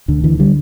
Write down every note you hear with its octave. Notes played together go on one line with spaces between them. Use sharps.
D2 D3
D3 E3
D3 G3